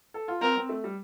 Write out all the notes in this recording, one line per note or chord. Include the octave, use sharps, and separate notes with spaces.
A4
F4
C4 A#4
C4
A3
G3